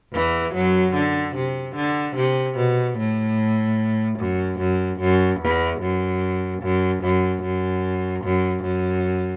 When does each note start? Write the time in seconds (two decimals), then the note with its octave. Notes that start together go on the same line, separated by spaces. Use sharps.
0.14 E2 E3
0.54 F#2 F#3
0.94 D3
1.36 C3
1.75 D3
2.16 C3
2.57 B2
2.98 A2
4.19 F#2
4.59 F#2
5.00 F#2
5.40 E2
5.81 F#2
6.62 F#2
7.03 F#2
7.42 F#2
8.24 F#2
8.63 F#2